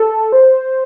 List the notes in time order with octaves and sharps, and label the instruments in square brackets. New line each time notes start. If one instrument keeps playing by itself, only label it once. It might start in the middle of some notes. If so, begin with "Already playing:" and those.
Already playing: [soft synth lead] A4
C5